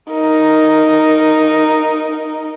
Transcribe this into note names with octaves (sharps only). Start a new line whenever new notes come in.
D#4 A#4